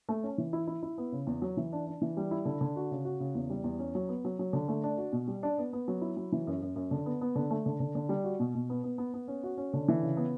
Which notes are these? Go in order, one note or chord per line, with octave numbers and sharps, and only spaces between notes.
A3
C#4
E3
E4
E4
E4
B3
C#3
E2
F#3
E3
D4
D4
E3
G3
E4
D3
D3
F#4
C#3
F#4
C#3
E2
G3
E2
C#4
F#3
B3
F#3
F#3
D3
A3
D4
F#4
B2
G3
D4
B3
B3
F#3
E4
F#3
E3
F#2
F#2
F#2
D3
B3
B3
D3
A3
D3
D3
D3
G3
F#4
B2
B2
B3
B3
B3
B3
C#4
F#4
C#4
D3
E3
C#3
B3